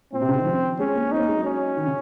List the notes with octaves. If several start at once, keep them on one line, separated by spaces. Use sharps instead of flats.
A#2 C4
C3
C#3
D#3
F3
G#3 C#4
A#3
C4 D#4
A#3
G#3
F#3
C#4
D#3
C#3